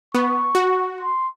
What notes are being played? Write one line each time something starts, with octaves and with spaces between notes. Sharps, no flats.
B3 C#6
F#4
C6